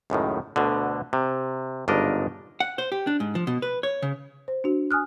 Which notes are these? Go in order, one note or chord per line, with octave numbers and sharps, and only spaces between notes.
C#2 F#2 A2 D#3
D2 B2 D3
C3
G1 G#2 C#3 D4 A#4 D#5
F#5
C5
G4
D4
G#2
F3
B2
B4
C#5
C#3
C5
D4 F#4
G#5 D#6 F6 F#6